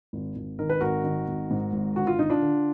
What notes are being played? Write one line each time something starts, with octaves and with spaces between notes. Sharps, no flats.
G#1
G#1
D#3 A#4
B4
G#1 F#4 A#4
D#3
G#1
G#2
G#1
D3 F#4
F4
D3 D#4
D4 F4
D3